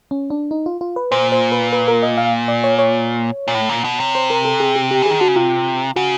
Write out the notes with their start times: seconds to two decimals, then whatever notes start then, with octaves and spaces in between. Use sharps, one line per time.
0.11 C#4
0.30 D4
0.51 D#4
0.66 F4
0.81 F4
0.96 B4
1.11 A#2 C5
1.32 C5
1.52 B4
1.73 B4
1.88 A#4
2.03 D#5
2.18 F5
2.48 D5
2.64 C#5
2.79 C#5
3.48 A#2
3.54 A2
3.69 A#2
3.84 B2
4.00 C3
4.15 C5
4.30 A#4
4.45 A4
4.60 G#4
4.76 G4
4.91 G4
5.02 E3
5.06 D#3 G#4
5.20 D3 F#4
5.28 C#3
5.36 C3 F4
5.96 C#3 F#4